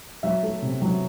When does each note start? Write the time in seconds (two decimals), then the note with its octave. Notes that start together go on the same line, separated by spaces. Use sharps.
0.23 F#3 E5
0.43 A3
0.62 C3
0.82 F#3